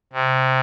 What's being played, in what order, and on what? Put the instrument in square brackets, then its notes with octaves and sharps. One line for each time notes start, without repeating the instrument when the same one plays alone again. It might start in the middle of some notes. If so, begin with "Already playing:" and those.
[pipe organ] C3